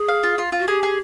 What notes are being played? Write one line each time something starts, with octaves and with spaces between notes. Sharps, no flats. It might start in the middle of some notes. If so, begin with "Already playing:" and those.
Already playing: G#4
F5
F4
F4
F4
F#4
G4 G#4
G#4